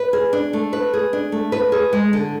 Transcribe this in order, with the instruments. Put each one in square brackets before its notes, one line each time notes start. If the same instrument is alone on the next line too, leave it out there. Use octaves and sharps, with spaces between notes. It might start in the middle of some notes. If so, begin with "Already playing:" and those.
Already playing: [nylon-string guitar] B4
G#4
D4
A3
B4
G#4
D4
A3
B4
G#4
G#3
D3